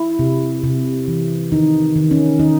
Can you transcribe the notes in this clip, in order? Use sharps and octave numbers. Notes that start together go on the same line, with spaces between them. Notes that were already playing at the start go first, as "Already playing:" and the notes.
Already playing: E4
C3
C3
E3
D#3 D#4
D#3
C#4
D#3 D#4